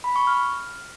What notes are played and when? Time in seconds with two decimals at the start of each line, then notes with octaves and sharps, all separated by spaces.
0.04 B5
0.16 C#6
0.27 F6